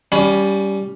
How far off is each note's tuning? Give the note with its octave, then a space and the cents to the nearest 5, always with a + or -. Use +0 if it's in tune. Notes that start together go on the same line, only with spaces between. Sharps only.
G3 +0 C#4 +20 B5 +0